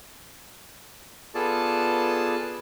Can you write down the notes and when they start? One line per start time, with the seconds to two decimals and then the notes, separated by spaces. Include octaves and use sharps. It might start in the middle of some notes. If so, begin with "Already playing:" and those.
1.35 B3 F4 G#4 A4 D5 A5